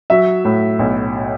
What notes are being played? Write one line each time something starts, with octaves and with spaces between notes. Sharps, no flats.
F#3 E5
A2
B1